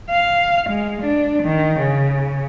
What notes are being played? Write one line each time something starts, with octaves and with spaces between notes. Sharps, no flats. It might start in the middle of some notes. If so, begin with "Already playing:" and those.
F5
G#3
D4
D#3
C#3